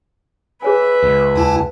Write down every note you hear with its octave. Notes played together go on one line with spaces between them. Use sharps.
G#4 B4 C#5 E5 G#5
C#2
D#2 E4 A5